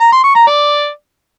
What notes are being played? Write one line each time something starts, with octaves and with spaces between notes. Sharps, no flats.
A#5
C6
C#6
A#5
D5